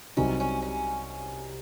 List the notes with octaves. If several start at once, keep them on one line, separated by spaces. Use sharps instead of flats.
C2 C3 F#3 C4 C#4 D#4
C#4
C#4